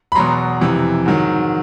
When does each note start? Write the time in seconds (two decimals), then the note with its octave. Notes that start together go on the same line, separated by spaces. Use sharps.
0.12 B5
0.15 E2 B2 F#3 A#5 C6
0.61 F2 C3 E3
1.06 G#2 D#3 F#3